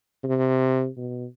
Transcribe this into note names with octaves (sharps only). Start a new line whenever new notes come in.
C3
B2